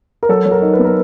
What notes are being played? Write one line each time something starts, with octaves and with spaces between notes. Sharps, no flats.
A#4
F#3 A4
F#3
A#4
D#4
B4
B3
A#4